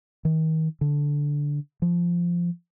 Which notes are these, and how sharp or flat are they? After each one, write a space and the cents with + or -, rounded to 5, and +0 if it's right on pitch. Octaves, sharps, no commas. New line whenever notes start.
D#3 +35
D3 -10
F3 -10